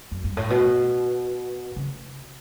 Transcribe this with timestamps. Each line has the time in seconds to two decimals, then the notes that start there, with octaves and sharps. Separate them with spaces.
0.11 F#2
0.24 G2
0.37 A2
0.50 B2
1.76 C#3